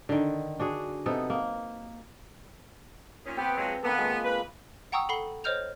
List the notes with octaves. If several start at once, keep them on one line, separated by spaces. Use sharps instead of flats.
D3 D#3
D4 F#4 G#4
C3 B3 D#4 A4
A#3
A#2 D#3 C#4
B3 C4 G4 B4
F3 F#3 G#3
D#3 A#3 B3 A4
G#3 F4
B4
F#5 G5 A#5 C#6 D#6 E6
A4 F#5 B5 C7 G7
C5 C#5 D#5 F6 G6 F7